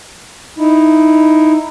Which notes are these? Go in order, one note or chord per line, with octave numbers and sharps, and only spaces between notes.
D#4 E4